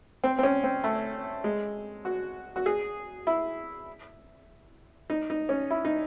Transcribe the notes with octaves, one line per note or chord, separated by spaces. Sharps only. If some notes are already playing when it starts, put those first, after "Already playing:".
C4
C4
C#4
C4
A3
G#3
F#4
F#4
G#4
E4
D#4
D#4
C#4
E4
D#4